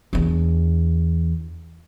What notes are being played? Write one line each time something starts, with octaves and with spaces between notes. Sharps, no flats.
E2 D4